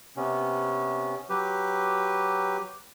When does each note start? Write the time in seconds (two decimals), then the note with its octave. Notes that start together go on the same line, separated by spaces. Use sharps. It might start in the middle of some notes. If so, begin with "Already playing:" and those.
0.17 C3 B3 C#4
1.30 F#3 G4 B4